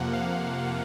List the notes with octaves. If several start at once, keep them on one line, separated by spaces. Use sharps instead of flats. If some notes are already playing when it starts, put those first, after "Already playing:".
Already playing: F2 C3 F3 A#3 F#5
F5